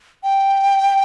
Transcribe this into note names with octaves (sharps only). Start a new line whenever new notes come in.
G5